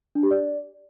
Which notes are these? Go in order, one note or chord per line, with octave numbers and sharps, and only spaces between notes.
D4
G4
D5